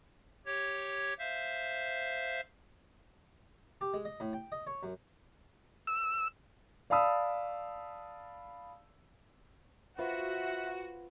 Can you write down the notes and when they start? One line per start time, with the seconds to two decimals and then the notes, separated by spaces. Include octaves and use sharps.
0.46 G4 C#5 G#6
1.19 C5 E5 F5
3.81 G4
3.93 G#3
4.05 D#5
4.20 A2
4.33 G5
4.52 D#5
4.67 C#5
4.83 F#2
5.87 E6
6.90 D5 F5 A5 B5 D#6 E6
9.98 F4 F#4 B4 C5 E5 F#5